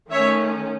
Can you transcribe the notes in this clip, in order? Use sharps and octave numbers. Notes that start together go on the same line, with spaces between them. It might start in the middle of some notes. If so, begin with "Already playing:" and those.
D#3 A3 C#4 C#5 E5